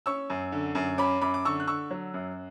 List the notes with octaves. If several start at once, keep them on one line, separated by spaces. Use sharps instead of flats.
C#4 C#6 E6
F#2
D3
F#2
C#4 B5 D6
F#2 B5 D6
D6
D3 C#6 E6
F#6
D3 C#6 E6
F#3
F#2